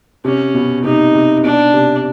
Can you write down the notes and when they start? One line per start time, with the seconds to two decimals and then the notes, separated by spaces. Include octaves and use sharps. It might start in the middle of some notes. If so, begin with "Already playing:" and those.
0.25 C3 C#4
0.54 B2
0.84 C3 D#4
1.14 C3
1.44 B2 D4
1.74 C3